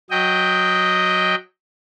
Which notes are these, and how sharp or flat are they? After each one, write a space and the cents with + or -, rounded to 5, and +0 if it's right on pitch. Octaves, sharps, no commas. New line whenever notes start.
F#3 -10 D#5 +0 G5 +0